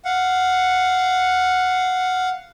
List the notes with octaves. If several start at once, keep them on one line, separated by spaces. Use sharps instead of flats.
F5 F#5